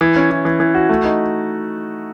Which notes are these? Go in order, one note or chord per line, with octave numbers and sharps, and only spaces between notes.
E3
C#4
E3
E3
E3
F#4
A3
D#4